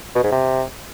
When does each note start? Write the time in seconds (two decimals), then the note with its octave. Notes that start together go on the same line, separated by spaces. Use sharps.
0.15 B2
0.24 G#2
0.32 C3